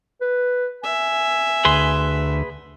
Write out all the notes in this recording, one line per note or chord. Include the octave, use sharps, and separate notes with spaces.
B4
E5 G#5
D2 G#4 B4 C6